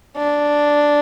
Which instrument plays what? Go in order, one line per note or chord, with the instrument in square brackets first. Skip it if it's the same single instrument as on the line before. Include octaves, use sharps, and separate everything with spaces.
[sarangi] D4